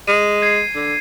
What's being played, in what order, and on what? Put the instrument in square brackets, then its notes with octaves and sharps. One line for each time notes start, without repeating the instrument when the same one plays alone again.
[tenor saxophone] G#3 [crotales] D#7
[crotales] G#6 C7
[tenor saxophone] D3